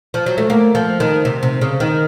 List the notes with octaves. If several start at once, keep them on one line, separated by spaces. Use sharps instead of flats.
F3
F#3
A3
A#3
F3
D#3
C3
C3
C#3
D#3